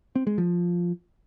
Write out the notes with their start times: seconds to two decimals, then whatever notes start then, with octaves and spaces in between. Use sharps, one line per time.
0.16 C4
0.27 G#3
0.38 F3